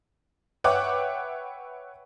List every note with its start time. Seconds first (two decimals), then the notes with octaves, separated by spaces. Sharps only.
0.64 B4 C#5 E5 F#5 G5 D6